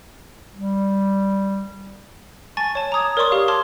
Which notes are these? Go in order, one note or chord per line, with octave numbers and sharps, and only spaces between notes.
G3
G#5 A5 C#6 A6
C#5 A5
A#5 D6 D#6 G#6
A#4 C#5 D5 C6 C#6 D#6
G4 F5
A5 C6 D6 F6 G#6